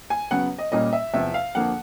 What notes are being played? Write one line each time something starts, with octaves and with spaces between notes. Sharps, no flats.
G#5
C#3 F#3 B3 F#5
D#5
A#2 G3 A#3 C#4 D#5
E5
E2 C3 F3 E5
F5
F2 D3 F3 A#3 F#5